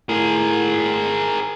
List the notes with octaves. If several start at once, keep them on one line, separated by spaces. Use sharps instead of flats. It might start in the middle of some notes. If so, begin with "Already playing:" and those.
A2 G#4 A#4